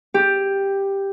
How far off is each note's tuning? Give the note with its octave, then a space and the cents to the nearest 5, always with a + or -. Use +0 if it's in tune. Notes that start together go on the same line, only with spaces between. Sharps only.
G4 +5